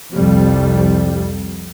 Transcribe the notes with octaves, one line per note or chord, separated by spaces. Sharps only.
C2 F2 G3